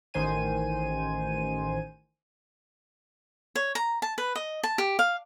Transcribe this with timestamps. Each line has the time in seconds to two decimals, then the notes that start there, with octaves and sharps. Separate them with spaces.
0.14 A1 D#3 C5 G#5 D#7
3.55 C#5
3.75 A#5
4.02 A5
4.18 B4
4.35 D#5
4.63 A5
4.78 G4
4.99 F5